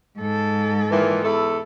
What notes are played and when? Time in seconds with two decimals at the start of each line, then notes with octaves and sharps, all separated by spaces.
0.18 G#2 A4
0.90 A#2 D#3 E3
1.23 E2 E4 A4